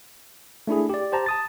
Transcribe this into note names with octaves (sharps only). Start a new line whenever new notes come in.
A3 D4 E4 G#4
G4 D5
G4 C5 A5 A#5
A5 D#6 A6